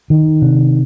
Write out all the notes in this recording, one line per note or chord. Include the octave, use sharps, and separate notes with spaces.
D#3
C3